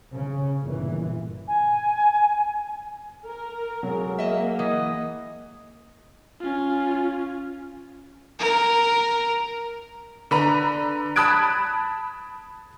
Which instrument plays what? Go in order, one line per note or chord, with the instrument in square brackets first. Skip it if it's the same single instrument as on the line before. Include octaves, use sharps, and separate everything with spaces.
[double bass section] C#3 C#4
G1 A#2 E3
[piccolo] G#5
[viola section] A#4
[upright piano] F#3 G#3
[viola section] A#3 [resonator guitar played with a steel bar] D#5 E5
[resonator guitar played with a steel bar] E3 [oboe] D#5
[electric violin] C#4 F4
A#4
[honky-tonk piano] D3 B4 A#5
A5 B5 D#6 F#6 G#6 D7